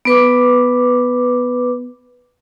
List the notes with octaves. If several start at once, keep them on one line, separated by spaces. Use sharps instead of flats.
B3 B4 D6